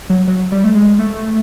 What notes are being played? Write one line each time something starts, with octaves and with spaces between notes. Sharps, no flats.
F#3
F#3
G3
A3
G#3
A3